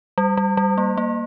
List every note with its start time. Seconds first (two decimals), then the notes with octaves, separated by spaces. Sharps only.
0.18 G3
0.37 G3
0.57 G3
0.78 A#3
0.98 A#3